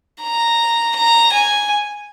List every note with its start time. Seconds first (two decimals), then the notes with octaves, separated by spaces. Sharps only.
0.22 A#5
0.96 A#5
1.33 G#5